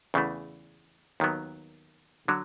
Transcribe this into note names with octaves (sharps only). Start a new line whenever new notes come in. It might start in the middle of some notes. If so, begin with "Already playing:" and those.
E2 C#3 E3 A3
D#2 D#3 F#3 B3
D3 F#3